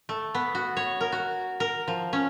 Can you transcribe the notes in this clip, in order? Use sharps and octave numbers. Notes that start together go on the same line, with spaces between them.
A3
B3
F#4
C#5
A#4
F#4
A#4
F3
C#4